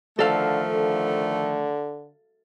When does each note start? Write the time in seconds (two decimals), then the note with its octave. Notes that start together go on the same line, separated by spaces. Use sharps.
0.19 D3 D#3 F3 A3 A4 F5
0.74 D3